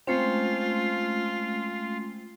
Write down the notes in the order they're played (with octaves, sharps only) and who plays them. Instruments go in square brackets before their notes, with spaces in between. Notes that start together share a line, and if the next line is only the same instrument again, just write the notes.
[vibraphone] G#3 A3 C#4 [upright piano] C4 [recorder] F4